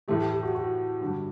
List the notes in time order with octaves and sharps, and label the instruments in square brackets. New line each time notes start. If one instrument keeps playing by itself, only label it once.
[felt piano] A2 E3 A3 [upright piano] G4
[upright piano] G4
F#4
F#4
[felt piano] G2 D3 G3